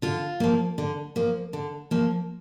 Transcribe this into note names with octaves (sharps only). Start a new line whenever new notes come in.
D3 F4
F3 A#3
D3
F3 A#3
D3
F3 A#3